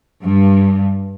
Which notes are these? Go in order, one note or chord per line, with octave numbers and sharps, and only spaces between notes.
G2